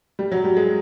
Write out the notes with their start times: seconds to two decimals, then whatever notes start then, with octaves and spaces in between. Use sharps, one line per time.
0.19 G3
0.32 F#3
0.44 G3
0.57 G#3